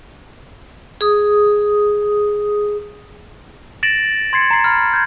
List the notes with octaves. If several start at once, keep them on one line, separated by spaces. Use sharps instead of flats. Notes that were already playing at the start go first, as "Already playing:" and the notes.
G#4 D#6
A6 A#6 D7 E7 F#7
C6 G#6 A6 C7 C#7
A#5 C7
B5 F6
G6 G#6